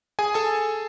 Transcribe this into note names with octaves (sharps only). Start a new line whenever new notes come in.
G#4 G#5
A4 A5